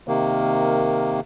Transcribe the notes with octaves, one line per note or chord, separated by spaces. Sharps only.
C3 D#3 A#3